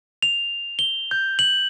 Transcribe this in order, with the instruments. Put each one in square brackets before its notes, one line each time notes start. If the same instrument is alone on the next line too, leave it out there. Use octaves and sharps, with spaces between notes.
[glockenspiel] F7
G7
G6
F#7